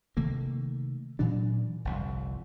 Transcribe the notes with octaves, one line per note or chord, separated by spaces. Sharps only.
C3 D#3 A3 A#3
A#2 E3 F#3 D4
G1 C2 F2